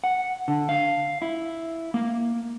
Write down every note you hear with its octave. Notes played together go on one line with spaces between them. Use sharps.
F#5
D3
F5
E4
A#3